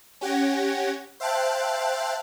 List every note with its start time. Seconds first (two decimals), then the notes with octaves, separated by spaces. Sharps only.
0.21 C#4 G4 F#5 G#6 A#6
1.20 C5 E5 F5 G5 A5 F#6